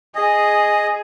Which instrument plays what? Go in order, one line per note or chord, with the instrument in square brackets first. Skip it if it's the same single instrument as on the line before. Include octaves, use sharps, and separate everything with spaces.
[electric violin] G#4 [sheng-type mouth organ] D#5